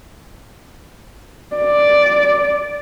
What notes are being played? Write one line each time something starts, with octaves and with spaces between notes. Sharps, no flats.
D5